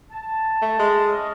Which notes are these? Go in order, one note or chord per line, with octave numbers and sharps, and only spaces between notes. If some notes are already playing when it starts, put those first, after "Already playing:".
A5
A3
G#3
C#4 D#5